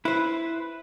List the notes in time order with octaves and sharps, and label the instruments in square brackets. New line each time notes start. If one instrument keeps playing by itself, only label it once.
[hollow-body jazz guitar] E4 C5 [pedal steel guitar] B4